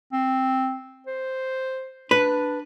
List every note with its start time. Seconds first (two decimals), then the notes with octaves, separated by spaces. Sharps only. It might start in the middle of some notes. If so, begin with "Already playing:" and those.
0.13 C4
1.07 C5
2.11 D4 B4